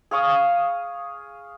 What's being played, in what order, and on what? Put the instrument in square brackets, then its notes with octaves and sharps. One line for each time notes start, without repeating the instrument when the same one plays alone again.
[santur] G#4 F5 C#6 D#6